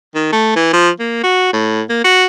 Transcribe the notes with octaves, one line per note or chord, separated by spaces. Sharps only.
D#3
A3
E3
F3
A#3
F#4
A2
A#3
F#4